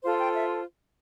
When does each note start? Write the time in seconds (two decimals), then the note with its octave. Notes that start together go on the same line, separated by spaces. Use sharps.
0.04 F4 A4 C5 F5
0.18 G5
0.34 E5